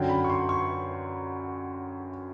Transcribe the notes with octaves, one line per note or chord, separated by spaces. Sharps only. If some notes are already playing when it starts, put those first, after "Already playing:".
Already playing: F#2 D3 F#3 G5
B5
C#6
C6
C#6